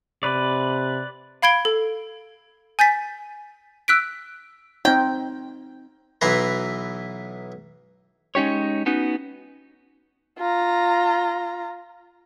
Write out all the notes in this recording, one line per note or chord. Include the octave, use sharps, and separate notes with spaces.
C3 B4 D5
F5 B5 G#6 D7 G7
A4
G#5 G6 A6 B6
E6 F#6 B6 D7
C4 D#4 G5
B1 E3 E4 B4 A#5 C6
G#3 C#4 D#4 G4 C#5
B3 C#4 D#4 F#4
F4 A#5